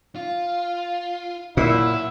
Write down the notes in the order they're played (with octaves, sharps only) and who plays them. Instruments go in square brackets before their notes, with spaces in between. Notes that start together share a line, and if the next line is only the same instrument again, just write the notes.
[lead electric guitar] F4
[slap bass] A#2 [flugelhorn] E4 [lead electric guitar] C#5 F#5 [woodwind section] E6